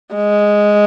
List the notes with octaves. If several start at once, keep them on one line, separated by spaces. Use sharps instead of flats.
G#3